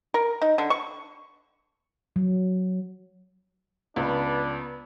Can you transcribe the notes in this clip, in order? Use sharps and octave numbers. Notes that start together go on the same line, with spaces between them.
A#4
D#4
D3
C#6
F#3
C#2 B3 D4